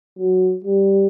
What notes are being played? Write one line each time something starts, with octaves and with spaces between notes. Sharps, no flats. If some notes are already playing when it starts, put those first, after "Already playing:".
F#3
G3